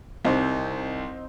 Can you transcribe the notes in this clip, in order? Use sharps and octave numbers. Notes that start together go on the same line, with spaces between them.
C2 C4 D#4 C5